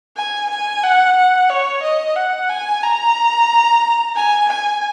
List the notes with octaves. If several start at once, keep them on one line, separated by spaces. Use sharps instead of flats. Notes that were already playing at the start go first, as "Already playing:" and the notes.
G#5
G#5
F#5
F#5
C#5
D#5
F#5
G#5
A#5
G#5
G#5